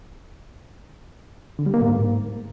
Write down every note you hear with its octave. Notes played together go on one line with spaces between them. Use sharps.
D3
G3
A#3
A2
G#2